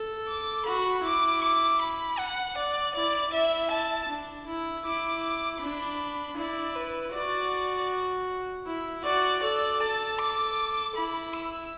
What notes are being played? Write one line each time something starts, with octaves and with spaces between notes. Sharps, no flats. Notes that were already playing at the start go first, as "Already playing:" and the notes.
Already playing: A4
D6
F#4 B5
E4 D6
D6
B5
F#5
D5
E4 D5
E4 E5
A5
D4
E4
E4 D6
D6
D4 B5
E4 D5
B4
F#4 D5
E4
F#4 D5
A4 D5
A4 A5
D6
E4 B5
E6